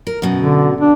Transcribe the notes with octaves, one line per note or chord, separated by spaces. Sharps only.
A#4
F#2 B2
D3
D4